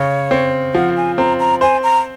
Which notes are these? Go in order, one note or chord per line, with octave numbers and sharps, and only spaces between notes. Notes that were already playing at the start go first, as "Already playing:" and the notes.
Already playing: C#3 C#5
C4
F3 F#5
G#5
C4 A#5
A#5
C5 G#5
A#5